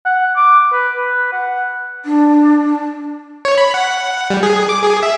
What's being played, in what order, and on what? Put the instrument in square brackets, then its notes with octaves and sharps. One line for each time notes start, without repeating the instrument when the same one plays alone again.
[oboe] F#5
D6
B4
B4
F#5
[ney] D4
[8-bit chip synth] C#5
B5
F#5
G3
G#4
D6
G#4
E5